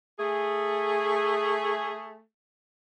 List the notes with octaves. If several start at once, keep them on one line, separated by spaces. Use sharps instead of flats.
A3 G#4